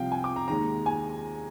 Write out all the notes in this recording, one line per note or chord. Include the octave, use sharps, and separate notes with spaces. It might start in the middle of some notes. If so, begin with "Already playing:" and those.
Already playing: C2 C3 F3 F5 G5
G#5
D6
A#5
D#2 D#3 G#3 A#5
G#5